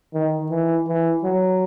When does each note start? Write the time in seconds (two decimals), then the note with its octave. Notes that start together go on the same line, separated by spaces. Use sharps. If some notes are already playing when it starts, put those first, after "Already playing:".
0.14 D#3
0.51 E3
0.88 E3
1.24 F#3